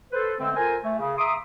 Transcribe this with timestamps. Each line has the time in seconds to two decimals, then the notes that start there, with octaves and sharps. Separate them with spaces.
0.13 A4 B4 C5
0.40 D3 G#3 A3 C4
0.57 F4 A4 A#4 C5 G#5
0.84 A3
1.00 C#3
1.18 E5 A#5 C6 D6 D#6